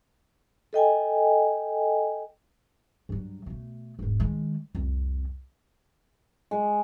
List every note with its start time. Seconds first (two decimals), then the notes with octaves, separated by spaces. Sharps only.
0.73 A4 D#5 G5 G#5
3.09 G2 F#3
3.46 B2 A3
3.99 E1 G#2
4.20 D#3 G#3
4.75 C2 F2
6.51 G#3